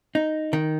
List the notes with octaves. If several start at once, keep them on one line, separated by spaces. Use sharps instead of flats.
D#4
D#3